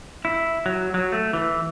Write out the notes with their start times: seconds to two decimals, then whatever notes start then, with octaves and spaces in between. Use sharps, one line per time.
0.25 E4
0.66 F#3
0.94 F#3
1.12 A3
1.33 E3